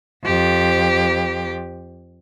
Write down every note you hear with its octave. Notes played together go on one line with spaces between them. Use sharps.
F2 G4